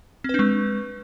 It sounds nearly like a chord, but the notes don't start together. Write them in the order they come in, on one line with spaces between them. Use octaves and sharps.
C4 B4 D4 G#3